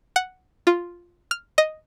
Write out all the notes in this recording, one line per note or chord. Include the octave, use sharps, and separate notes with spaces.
F#5
F4
F6
D#5